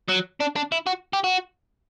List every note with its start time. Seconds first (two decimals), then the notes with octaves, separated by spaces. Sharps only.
0.08 F#3
0.40 D4
0.56 D4
0.72 E4
0.87 F#4
1.13 G4
1.24 F#4